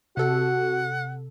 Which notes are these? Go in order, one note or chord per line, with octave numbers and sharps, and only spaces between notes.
C3 F#4 A4 F#5